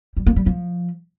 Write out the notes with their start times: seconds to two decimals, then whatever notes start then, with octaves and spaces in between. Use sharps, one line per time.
0.17 G3
0.26 A#3
0.36 G3
0.46 F3